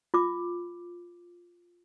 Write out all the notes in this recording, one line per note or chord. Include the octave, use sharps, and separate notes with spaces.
F4 D6